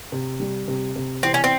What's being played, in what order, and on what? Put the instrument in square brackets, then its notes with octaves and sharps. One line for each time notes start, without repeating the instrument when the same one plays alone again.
[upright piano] C3
G3
C3
C3
[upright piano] E3 [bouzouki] C4
[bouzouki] C#4
C4